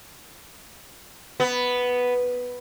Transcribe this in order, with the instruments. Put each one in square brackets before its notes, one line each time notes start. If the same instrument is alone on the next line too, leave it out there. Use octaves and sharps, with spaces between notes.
[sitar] B3